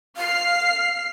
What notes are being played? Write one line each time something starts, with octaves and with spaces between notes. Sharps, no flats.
F5 F6 C7